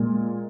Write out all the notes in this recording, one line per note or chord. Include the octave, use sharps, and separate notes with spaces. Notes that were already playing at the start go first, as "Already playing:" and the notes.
Already playing: A#2 G#3